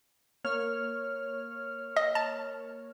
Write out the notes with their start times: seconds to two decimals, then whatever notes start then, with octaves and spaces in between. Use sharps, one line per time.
0.44 A#3 C#5 F6
1.96 D#5
2.15 A5